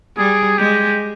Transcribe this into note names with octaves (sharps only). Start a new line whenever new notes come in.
G3 G#4
G#3 G4